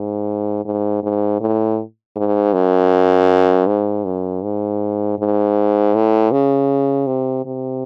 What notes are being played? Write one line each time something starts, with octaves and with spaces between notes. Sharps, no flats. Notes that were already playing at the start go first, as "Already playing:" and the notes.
Already playing: G#2
G#2
G#2
A2
G#2
F#2
G#2
F#2
G#2
G#2
A2
C#3
C3
C3